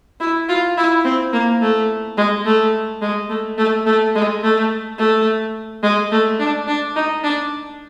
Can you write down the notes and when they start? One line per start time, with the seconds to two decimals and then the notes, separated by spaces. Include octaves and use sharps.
0.20 E4
0.49 F4
0.77 E4
1.04 C4
1.33 A#3
1.62 A3
2.17 G#3
2.45 A3
3.02 G#3
3.29 A3
3.58 A3
3.86 A3
4.15 G#3
4.43 A3
4.98 A3
5.83 G#3
6.12 A3
6.39 D4
6.67 D4
6.96 D#4
7.23 D4